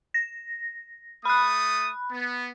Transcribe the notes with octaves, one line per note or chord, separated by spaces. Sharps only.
A#6
A3 B5 D#6 F#6
B3